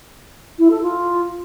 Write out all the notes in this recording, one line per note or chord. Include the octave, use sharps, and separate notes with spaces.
E4
A4
F4